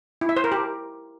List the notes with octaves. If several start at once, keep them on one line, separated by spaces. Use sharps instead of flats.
E4
E5
C5
A#4
G4